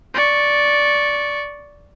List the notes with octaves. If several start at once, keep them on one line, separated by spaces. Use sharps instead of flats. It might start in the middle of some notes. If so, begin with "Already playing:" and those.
D5 C#6